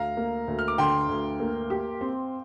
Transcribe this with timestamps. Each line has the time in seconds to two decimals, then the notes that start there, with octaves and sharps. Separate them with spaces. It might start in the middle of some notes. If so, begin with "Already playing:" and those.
Already playing: D2 F5 A#5
0.17 A#3
0.48 D2
0.59 F6
0.68 D6
0.78 D3 G5 C6
1.09 D2
1.40 A#3
1.70 G4
2.01 C4